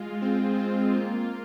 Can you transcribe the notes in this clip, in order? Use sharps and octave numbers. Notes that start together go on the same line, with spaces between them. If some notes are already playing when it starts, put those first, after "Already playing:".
Already playing: G#3 F4
C4
F4
A#3